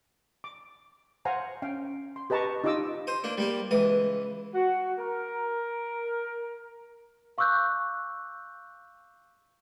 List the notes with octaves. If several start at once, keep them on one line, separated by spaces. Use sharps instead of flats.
D6
C5 F5 F#5 G#5 A#5
C#4 F5 G5
C6
G4 B4 D#5 A5 A#5 C#6
D#4 F4 G4 D#5 D6 E6
C5 D#6
A#3 D4
G3 A#3 G4
C#2 E3 D#6
F#4
A#4
F5 C#6 D6 E6 F#6 G6